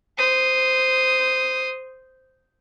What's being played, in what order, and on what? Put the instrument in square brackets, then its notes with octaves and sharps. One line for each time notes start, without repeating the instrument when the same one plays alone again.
[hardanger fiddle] C5 D#6